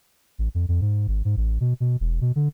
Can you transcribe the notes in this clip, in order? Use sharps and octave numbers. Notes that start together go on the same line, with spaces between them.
A1
F2
F2
G#2
G#1
G#2
A1
B2
B2
E1
B2
D3